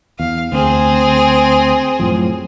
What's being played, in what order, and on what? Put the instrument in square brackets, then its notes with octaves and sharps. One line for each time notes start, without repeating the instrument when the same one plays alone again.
[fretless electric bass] E2 [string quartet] F5
[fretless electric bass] D2 [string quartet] C4 G#4
[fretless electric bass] F#2 A2 F3